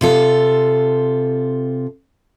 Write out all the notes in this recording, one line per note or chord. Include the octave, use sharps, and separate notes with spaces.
C3 F4 A4